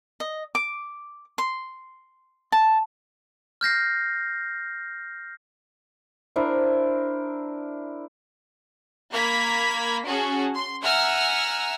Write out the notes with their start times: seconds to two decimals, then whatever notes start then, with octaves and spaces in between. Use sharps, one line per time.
0.20 D#5
0.55 D6
1.38 C6
2.52 A5
3.61 F6 G6 A#6 C7
6.36 D4 E4 A#4 C5
9.12 A#3 A#5 B5 G#6 B6
10.05 C#4 F#4 G#4 A5
10.54 C6
10.83 E5 F#5 G#5 A#5 E6 F6